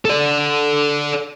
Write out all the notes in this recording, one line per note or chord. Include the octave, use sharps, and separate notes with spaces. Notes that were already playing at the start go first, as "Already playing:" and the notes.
A4 D5